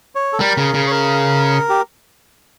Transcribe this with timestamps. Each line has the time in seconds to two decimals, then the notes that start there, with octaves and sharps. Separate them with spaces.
0.15 C#5
0.33 A4
0.40 G3 A#4
0.57 C#3
0.74 C#3
0.87 C#5
0.91 A#4
1.69 G4